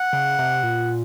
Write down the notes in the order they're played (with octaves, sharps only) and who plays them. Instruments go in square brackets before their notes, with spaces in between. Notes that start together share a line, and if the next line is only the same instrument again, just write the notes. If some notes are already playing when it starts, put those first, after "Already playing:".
Already playing: [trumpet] F#5
[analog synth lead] C#3
C3
A#2